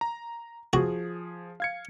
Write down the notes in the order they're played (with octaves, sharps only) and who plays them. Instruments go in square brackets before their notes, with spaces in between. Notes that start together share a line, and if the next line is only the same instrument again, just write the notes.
[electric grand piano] A#5
[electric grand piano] F3 G#4 [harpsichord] F#4
[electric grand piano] F5 G#6 C#7